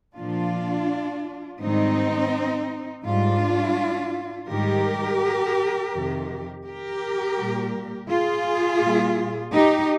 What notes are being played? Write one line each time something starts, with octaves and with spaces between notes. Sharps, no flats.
A#2 F3 D4 F4
G#2 D#3 G3 C4 D#4
G#2 G3 D4 F4
G#2 D#3 G3 G4 A#4
F2 C3 D#3
G4 A#4
A#2 G3
F4 G#4
A#2 G3
D#4 G4